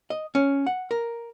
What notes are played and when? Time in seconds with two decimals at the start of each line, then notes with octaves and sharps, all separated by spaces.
0.10 D#5
0.35 C#4
0.67 F#5
0.91 A#4